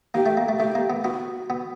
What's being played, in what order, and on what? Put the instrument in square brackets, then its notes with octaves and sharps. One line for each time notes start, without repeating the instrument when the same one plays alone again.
[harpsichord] A#3 [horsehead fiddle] G4
[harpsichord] A3
A#3
A3
[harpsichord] A3 [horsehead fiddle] G4
[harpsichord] A#3
B3
[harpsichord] B3 [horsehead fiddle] F#4
[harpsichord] B3